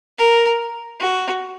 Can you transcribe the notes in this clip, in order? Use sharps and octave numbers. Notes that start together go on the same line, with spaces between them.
A#4
F#4